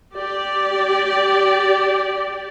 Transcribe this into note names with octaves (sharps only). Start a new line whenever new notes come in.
G4 D5